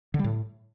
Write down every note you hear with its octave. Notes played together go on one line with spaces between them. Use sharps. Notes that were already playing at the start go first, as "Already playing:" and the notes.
D3
G3
A2